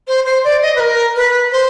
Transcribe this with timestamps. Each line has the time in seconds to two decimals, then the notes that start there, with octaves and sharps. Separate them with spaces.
0.07 C5
0.25 C5
0.44 D5
0.62 D#5
0.75 B4
0.80 A#4
1.16 B4
1.52 C5